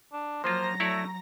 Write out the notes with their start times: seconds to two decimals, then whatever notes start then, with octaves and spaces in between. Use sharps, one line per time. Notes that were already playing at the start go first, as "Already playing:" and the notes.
0.13 D4
0.44 F3 F#3 A#3 F4 C5 A#5 A#6
0.80 A3 E4 C#5 D5